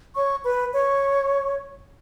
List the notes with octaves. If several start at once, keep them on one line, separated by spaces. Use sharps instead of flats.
C#5 C#6
B4 B5
C#5 C#6